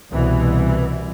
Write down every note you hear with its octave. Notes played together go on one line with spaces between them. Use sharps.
C2 B2 E3